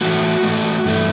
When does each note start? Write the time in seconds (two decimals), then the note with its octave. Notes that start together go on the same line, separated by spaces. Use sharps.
0.01 A2 E3 A3 F#4
0.43 A2 E3 A3
0.85 G2 E3 A3